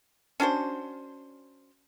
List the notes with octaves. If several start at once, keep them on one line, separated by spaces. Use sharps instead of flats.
C#4 D4 F#4 C5